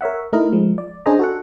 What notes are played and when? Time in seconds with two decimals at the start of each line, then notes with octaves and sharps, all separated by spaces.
0.01 A#4 C#5 E5 F#5
0.33 A3 D#4 E4 A#4 D#5
0.52 F3 G#3
0.78 D5
1.06 C#4 D4 G#4 C5 D#5 A#5
1.19 F#4 A4 F#5